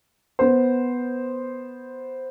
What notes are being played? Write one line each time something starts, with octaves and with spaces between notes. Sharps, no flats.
B3 C5